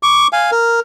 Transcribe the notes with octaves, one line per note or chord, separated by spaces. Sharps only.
C#6 D6
F5 G#5
A#4